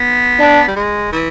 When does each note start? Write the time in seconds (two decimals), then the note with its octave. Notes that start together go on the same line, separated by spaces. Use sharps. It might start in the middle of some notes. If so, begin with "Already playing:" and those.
Already playing: B3
0.39 D4
0.68 G3
0.76 G#3
1.12 E3